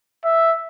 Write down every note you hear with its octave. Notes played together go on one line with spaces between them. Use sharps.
E5